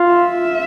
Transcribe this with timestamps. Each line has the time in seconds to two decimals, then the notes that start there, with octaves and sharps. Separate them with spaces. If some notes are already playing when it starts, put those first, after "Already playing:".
Already playing: F4
0.12 E5